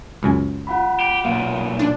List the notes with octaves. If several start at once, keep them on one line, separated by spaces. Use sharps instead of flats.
C#2 F#2 G#5
F4 F#5 B5
G4
B1 A#2 A#3
D4